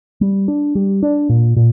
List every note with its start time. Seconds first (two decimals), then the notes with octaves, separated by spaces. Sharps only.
0.21 G3
0.48 D4
0.75 G3
1.03 D4
1.29 A#2
1.56 A#2